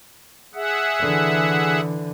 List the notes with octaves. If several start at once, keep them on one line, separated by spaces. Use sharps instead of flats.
G#4 E5 F#5
D3 E3